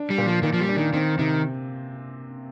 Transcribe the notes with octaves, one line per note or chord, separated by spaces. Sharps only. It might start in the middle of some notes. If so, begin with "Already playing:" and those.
Already playing: D4
G3
A#2
F3
A#2 D#3
F3
G3
D4
D#3
D#3 C4
C3 D#3